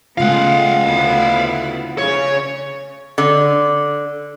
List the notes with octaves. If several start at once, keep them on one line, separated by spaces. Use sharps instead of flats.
C#3 G#3 A3 B3 F4 F5 F#5
D2 B3 E4
C#3 C#5
D3